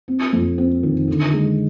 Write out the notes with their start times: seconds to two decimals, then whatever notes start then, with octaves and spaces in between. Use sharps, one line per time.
0.08 C4
0.33 F2
0.58 C4
0.83 D#3
1.08 D3
1.33 G#3